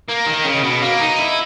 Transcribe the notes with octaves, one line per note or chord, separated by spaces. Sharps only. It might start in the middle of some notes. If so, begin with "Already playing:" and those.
A#3
D#3
C#3
B2
A#3
D#4
E4